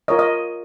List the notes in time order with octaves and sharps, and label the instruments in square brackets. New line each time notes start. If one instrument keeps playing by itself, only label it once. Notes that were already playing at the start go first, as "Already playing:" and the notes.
[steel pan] F4 A#4 C#5 D#5
D#5